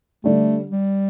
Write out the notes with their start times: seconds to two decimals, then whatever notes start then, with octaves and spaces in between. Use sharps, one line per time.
0.24 D3 G3 A3 D4 G4
0.71 G3